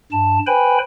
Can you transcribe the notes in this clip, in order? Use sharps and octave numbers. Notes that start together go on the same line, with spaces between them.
G2 A5
B4 C5 G5 G#5 B5